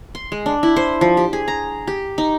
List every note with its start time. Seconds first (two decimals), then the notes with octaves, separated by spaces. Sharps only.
0.15 C6
0.32 G#3
0.46 D4
0.63 E4
0.76 C5
1.01 F3
1.17 G4
1.33 G#4
1.48 A#5
1.87 G4
2.18 D#4